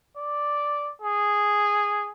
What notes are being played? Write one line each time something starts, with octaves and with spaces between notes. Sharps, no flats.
D5
G#4